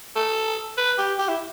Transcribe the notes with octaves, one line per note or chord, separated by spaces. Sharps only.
A4
B4
G4
G4
E4